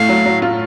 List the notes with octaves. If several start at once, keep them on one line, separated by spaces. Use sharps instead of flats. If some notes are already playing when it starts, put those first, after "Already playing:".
Already playing: A2 A3 F5
F#3
F#3
F4